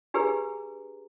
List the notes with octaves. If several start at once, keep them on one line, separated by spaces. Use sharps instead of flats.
D4 G4 G#4 B4 A#5